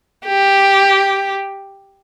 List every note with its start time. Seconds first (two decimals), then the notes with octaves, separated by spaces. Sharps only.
0.26 G4